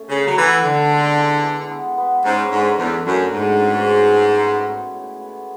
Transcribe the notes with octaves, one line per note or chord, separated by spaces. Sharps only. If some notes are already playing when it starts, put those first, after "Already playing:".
Already playing: A3 C#4
C#3 A4
F#3
E3 B3
D3 A4
G#3
E3
E3
B3
B3
G#2 C#4
G#2 D3
E2 D4
F#2 A3
G#2 B2
C#4
F#3
A2
B3
G#3
A2
B3